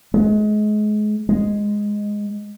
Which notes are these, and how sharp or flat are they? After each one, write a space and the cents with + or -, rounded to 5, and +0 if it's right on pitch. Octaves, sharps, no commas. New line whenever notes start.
G#3 +30
G#3 -5